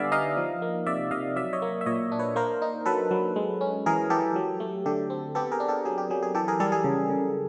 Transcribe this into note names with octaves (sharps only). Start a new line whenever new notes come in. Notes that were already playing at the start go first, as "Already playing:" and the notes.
Already playing: D3 G3 B3 D5 E5 F5 G#5
D#4 D#5 F5
F3
A#3
C3 D5 E5
C3 D#5 F5
F#3 D5 E5
C#5 D#5
A#3
E5
A#2 C#5 D#5
D4
B4 C#5
A#3 A#4 C5
D#4
F#3 A4 B4
F#3
G#3
C#4
E3 G#4 A#4
E3 G4 A4
F#3
A3
D3 G4 A4
C4
B3 G4 A4
G#4 A#4
D4
G4 A4
F#3 G#4
G4
F#3 G#4
G#4
E3 G4 A4
G#4 A#4
G3 G4 A4
G#4
C#3
C#3